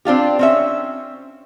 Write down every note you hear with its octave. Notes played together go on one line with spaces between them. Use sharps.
C4 D4 F4 G4
C4 C#4 E5